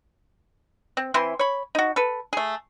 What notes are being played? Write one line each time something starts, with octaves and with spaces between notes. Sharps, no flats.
C4
E3 C4 E4 C6
C#5 B5
D#4 F#4
A4 B4
A3 G#4